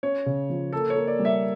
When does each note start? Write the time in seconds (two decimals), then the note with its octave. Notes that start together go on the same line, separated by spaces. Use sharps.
0.03 C#4 C#5
0.26 C#3
0.50 F3
0.73 A#3 A4
0.90 C#5
0.96 A#3
1.07 D5
1.19 G3
1.25 E5